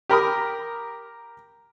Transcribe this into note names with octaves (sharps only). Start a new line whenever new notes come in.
G4 A#4 B5 D#6